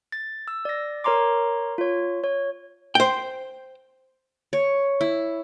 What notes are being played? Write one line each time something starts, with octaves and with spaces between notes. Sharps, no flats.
A6
E6
D5 A#6
A#4 C#5 A#5 C6 D6
F4 C#5
C#5
C5 G5
C#5
E4